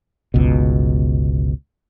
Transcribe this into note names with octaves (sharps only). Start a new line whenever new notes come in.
G1 C#2 B2